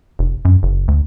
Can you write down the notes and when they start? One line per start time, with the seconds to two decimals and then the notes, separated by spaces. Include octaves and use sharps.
0.19 F1
0.45 F#2
0.63 F#1
0.88 D2